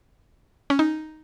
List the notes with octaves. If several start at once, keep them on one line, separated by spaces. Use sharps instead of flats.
C#4
D#4